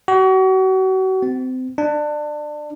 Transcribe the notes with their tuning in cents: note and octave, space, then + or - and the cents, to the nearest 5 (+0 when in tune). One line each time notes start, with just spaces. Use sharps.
F#4 +35
C4 -30
D4 +25